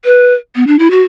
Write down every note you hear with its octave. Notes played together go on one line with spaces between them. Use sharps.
B4
B3
D4
E4
F#4